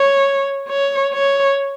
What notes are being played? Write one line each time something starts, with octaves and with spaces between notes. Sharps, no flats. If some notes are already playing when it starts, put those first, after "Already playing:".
Already playing: C#5
C#5
C#5